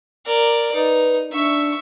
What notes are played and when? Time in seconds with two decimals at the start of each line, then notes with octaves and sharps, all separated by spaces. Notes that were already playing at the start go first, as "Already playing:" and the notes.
0.25 A#4 D5
0.75 D#4 B4
1.33 D4 E5 C#6